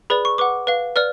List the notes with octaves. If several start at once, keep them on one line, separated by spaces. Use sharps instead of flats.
G#4 B4 D5 B5
C#6
B4 F#5 D6
B4 F5
B4 D5 F6